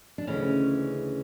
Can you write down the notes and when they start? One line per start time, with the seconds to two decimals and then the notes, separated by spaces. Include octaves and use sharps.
0.18 D4
0.27 D2 C#3 E3 G#3 C#4